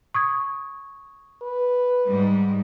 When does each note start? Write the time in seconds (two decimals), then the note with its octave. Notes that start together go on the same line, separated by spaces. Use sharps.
0.14 C#6 D#6 G#6
1.42 B4
2.06 G#2 G3